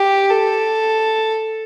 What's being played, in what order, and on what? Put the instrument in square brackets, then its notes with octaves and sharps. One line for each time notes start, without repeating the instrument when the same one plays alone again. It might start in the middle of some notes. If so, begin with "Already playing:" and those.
Already playing: [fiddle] G4
A4